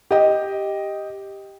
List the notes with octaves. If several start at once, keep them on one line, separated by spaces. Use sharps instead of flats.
G4 D#5